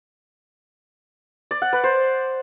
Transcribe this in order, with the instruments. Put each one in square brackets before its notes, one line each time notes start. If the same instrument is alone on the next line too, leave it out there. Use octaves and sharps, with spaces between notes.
[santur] D5
F#5
B4
C5